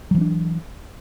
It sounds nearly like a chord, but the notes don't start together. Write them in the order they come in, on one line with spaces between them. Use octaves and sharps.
F#3 E3 B3 D4